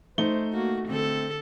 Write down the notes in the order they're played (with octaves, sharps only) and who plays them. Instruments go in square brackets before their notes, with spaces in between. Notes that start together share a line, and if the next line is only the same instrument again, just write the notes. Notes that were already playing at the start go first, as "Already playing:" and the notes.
[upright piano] A3 D#4 G7 [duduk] C5
[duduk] A#3 [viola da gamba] F#4
[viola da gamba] D3 A4 [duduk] C4